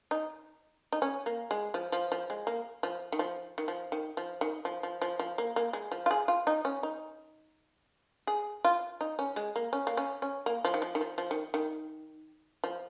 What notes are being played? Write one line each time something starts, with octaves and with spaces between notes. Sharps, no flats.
D#4
D#4
C#4
A#3
G#3
F3
F3
F3
G#3
A#3
F3
D#3
F3
D#3
F3
D#3
F3
D#3
F3
F3
F3
F3
A#3
A#3
G#3
F3
F4
G#4
F4
D#4
C#4
D#4
G#4
F4
D#4
C#4
G#3
A#3
C#4
A#3
C#4
C#4
A#3
F3
D#3
F3
D#3
F3
F3
D#3
D#3
F3